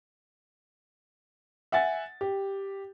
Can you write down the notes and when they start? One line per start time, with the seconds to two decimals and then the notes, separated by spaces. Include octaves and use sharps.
1.72 E5 F#5 G#5 A6
2.21 G4